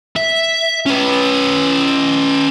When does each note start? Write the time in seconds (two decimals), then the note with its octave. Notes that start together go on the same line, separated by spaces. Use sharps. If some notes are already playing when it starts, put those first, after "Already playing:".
0.17 E5
0.86 C#4 B4